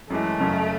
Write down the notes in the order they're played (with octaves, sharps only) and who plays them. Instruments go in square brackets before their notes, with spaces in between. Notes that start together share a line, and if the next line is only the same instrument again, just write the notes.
[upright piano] F#2 E3 G#3 [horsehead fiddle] A3
[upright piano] F#1 F#2 C#3 F#3 C#4